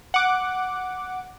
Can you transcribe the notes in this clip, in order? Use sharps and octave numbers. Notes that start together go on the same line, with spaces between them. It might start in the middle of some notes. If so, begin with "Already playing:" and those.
F#5 D6